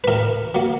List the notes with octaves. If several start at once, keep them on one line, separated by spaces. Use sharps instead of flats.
B4
A2 A#4
F#3 A#3